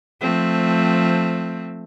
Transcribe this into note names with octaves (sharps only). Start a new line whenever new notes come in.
F3 A3 C4